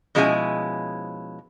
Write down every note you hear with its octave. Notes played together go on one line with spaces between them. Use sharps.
B2 F3 G#3 C#4 E4 G#5